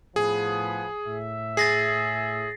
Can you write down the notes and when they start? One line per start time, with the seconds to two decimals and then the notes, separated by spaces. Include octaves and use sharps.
0.16 A2 F3 B3 G#4
1.07 A2 E5
1.57 G#4 A6 A#6 C7